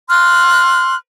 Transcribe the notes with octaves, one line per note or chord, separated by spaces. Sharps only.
C6 F6 F#6